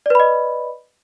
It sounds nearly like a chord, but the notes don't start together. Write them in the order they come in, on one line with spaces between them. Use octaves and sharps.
D5 B4 B5 D#5